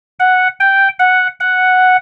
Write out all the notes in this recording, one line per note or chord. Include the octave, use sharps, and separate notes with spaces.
F#5
G5
F#5
F#5